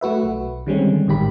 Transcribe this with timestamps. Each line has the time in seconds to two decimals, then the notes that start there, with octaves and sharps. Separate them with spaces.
0.01 A3 F#4 B4 E5
0.23 B1
0.66 D3 D#3 G3 G#3 C4 C#4
1.07 A1 G#2 D#3 G4 B5